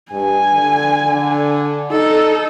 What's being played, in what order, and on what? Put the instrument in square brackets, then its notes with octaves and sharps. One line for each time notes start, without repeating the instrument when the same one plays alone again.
[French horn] G2 [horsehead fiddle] G#5
[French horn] D3
D3
[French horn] D#4 [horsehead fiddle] A4